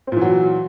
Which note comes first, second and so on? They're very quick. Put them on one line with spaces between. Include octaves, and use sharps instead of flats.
C4 A#2 E3 F#3